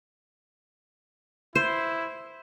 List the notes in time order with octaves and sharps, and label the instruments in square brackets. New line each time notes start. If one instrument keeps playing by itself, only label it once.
[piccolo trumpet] E4 [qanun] C5